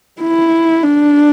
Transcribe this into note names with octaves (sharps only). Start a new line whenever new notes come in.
E4
D4